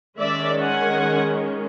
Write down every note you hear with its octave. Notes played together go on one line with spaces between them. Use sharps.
D#3 G#3 C#4 D5 E5
F#5 G#5